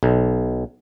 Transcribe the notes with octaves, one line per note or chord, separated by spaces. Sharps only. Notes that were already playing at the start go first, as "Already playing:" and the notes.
B1